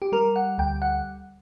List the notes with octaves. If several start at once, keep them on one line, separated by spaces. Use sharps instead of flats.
G4
G3 A#4
F#5
D2 G5
F#5